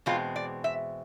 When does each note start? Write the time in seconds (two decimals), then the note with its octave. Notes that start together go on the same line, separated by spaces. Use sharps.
0.06 E2 B2 G#3 C4 F4
0.36 D5
0.64 E5